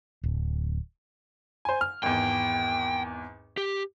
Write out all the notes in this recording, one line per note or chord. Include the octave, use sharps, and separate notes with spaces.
D1
C5 G#5
F6
G#1 E2 G5
G4